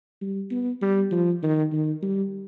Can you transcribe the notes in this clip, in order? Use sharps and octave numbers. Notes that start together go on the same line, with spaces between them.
G3
B3
G3
F3
D#3
D#3
G3